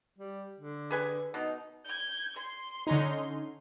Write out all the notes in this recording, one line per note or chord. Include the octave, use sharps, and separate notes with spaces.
G3
D3
G#4 B4 G#5
B2 D#4
G6 G#6
C6
D3 C#4 D#4